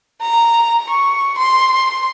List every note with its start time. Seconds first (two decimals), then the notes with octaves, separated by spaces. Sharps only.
0.22 A#5
0.90 C#6
1.38 C6